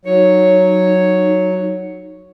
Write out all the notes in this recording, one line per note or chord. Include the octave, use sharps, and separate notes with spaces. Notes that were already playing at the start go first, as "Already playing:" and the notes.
F#3 D#4 C#5